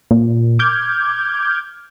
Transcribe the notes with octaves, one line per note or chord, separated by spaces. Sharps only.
A#2
D6 F6 G6 G#6